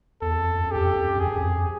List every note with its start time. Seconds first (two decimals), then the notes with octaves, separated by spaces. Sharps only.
0.22 E2 A4
0.39 F2
0.55 F2
0.66 F#2
0.71 F2 G4
0.87 F#2
0.96 F2
1.07 F#2
1.18 F2 G#4
1.27 F#2
1.39 F2